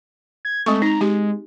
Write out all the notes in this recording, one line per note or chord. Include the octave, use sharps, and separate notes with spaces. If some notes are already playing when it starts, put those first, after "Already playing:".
G#6
G#3 A3 C4 C#6
D#4 A#5
G#3 G4